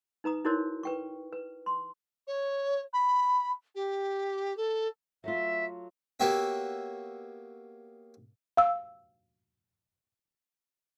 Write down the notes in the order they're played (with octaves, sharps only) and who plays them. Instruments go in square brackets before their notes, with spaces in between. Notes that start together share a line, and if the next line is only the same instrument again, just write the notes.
[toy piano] D#4 B4 A#5 D#6
D#4 E4 F#4 A#4 C5 C#5
B4 G5 C#6
B4
C6
[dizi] C#5
B5
G4
A4
[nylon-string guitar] F#3 A3 F4 [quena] E5
[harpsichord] A#3 B3 F#4 G4 C#5 E5
[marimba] F5 E6